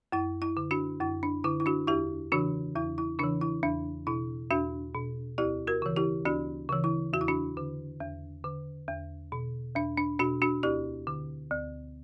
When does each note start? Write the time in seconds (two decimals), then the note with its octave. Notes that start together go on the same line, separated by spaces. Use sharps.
0.12 F#2 E4
0.42 E4
0.57 D3
0.71 D4 F#4
1.01 F#2 E4
1.23 D4
1.44 D3 E4
1.60 E4
1.66 D4 F#4
1.87 E2 E4 G4
2.32 C#3 E3 D4 F#4
2.75 E2 E4
2.98 E4
3.19 C#3 E3 D4
3.42 E4
3.63 E2 D4
4.07 B2 E4
4.51 E2 D4 F#4
4.94 B2
5.38 D2 E4 G4
5.67 F#4 A#4
5.82 C#3 E3
5.96 E4 G4
6.25 D2 D4 F#4
6.69 C#3 E3
6.84 E4
7.13 E2 F#4
7.21 E4
7.28 D4 F#4
7.57 D3
8.00 E2
8.44 D3
8.88 E2
9.32 B2
9.76 E2 D4
9.98 D4
10.19 B2 D4 F#4
10.42 D4 F#4
10.63 D2 E4 G4
11.07 D3
11.51 D2